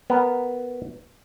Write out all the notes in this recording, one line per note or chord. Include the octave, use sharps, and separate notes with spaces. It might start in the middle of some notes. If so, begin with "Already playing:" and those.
B3 A#4